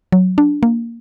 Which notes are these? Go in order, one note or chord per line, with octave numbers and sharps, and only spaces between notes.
F#3
D4
A#3